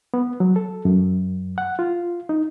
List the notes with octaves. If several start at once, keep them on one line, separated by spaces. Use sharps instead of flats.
B3
F#3
A4
F#2
F#5
F4
D#4